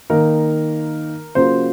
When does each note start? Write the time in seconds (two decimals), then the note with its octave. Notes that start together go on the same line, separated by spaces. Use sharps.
0.10 D#3 A#3 D#4 A#4
1.35 C#3 F#3 A#3 F4 C5